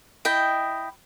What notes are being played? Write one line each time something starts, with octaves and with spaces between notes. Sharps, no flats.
E4 D#5 G5